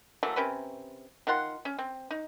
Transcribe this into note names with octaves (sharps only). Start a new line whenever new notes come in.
E3 F#3 A3 A#3
C3 C#4 A#4 B4
D#3 F4 F#5 C6
C#4
C4
D#4